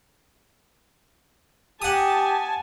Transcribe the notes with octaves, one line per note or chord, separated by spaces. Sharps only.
G4 F#5 G#5 A5 D#6